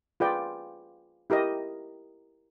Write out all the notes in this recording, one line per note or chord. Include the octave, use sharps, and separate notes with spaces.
F4 G#4 B4 D5 G5
E4 G4 A#4 D#5